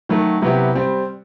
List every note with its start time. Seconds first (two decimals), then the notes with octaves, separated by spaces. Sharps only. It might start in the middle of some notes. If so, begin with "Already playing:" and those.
0.09 D#3 F#3 A3
0.42 C3 F#3 B3 E4 G4
0.75 G3 C4